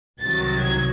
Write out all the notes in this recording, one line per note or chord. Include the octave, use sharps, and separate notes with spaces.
C2 C3 D#3 F#3 A6
G#6